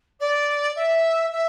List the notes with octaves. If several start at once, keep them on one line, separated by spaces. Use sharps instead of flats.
D5
E5
E5